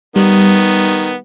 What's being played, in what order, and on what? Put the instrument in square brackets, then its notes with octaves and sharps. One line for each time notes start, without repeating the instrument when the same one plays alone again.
[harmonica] D#3 B3 [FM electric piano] G3